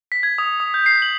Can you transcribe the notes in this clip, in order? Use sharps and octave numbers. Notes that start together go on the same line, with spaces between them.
B6
G#6
D#6
D#6
G6
C7
F#7